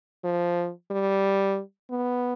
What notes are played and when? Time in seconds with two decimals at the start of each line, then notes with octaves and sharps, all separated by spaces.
0.24 F3
0.91 G3
1.91 B3